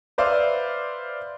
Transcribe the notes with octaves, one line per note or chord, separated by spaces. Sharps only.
B4 C5 D5 E5 F5